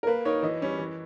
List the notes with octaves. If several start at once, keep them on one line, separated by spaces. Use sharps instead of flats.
A#4
A#3 B4
D#4 A#4 C#5
E3 D#5
G3 C#4
E3